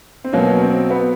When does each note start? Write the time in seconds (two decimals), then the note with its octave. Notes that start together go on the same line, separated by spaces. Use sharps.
0.24 C4
0.33 B2 F#3 A#3 C#4
0.61 C4
0.90 B3